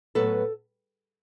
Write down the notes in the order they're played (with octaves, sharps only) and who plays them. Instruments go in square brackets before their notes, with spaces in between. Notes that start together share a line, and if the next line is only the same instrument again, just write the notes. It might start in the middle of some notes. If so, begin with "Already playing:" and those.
[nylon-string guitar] A2 F#3 B3 A4 B4